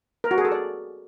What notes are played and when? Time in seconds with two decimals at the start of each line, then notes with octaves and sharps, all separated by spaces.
0.24 A#4
0.31 F#4
0.38 G#4
0.45 A4
0.52 D5